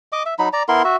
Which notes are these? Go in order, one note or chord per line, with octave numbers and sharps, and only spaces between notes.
D#5 D6
E5
F#3 D#4 B5
D5 A#5
B3 E4 A#4 C6
F#4 E5